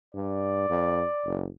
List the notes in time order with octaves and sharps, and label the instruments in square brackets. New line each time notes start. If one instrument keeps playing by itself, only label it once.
[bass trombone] G2 [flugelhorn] D5
[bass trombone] F2
F#1